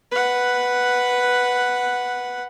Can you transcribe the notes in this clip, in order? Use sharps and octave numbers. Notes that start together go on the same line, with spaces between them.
B4 F#5